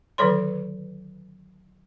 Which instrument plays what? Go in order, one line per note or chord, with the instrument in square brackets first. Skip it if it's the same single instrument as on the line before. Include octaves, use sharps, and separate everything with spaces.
[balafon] D3 D#3 F#3 A4 C#5 C6